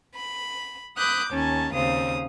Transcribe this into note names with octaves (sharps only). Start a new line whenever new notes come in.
B5
B5 D6 D#6 F#6 G6
D#2 C#4 G#5 A5
D#2 C#3 C4 F5 D#6